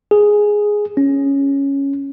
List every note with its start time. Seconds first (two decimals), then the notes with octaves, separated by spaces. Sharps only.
0.11 G#4
0.97 C#4